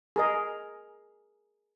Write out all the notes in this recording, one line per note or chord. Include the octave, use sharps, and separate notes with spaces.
G#4 A#4 D#5